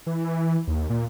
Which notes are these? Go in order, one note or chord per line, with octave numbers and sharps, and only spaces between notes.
E3
D#2
A#2